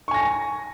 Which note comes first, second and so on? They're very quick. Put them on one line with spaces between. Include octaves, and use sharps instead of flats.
C#6 G#5 A#6